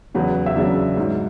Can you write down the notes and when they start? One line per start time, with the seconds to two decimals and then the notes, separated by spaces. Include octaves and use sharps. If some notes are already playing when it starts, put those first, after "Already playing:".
0.15 E2 C#3 F#3 B3 B4
0.46 E5
0.55 E2 C#3 F#3 D4 D5
0.97 G#2 F#3